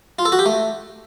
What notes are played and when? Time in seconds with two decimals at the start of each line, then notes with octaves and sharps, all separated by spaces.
0.19 F4
0.25 A4
0.32 F#4
0.39 G4
0.46 A3